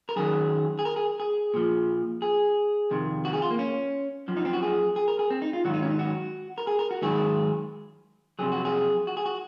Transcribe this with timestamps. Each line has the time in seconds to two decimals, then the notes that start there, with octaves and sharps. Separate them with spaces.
0.09 A#4
0.16 F#2 D#3 F#3 G#4
0.79 G#4
0.85 A#4
0.96 G#4
1.20 G#4
1.54 A#2 F3
2.22 G#4
2.91 F2 C3 D#3
3.25 F#4
3.33 G#4
3.42 F4
3.51 A#3
3.59 C#4
4.28 F#2 F3
4.37 D#4
4.45 C4
4.53 F#4
4.63 G#4
4.96 G#4
5.08 A#4
5.19 G#4
5.30 C4
5.42 D#4
5.53 F4
5.65 G#2 D#3 F#3 F#4
5.74 D#4
5.82 C#4
5.90 D#4
5.99 F#4
6.58 A#4
6.67 G#4
6.79 A#4
6.91 F#4
7.02 G#2 D#3 F#3 G#4
8.39 F2 C3 D#3 F#3 G#4
8.52 F#4
8.65 G#4
9.07 F#4
9.17 G#4
9.26 F#4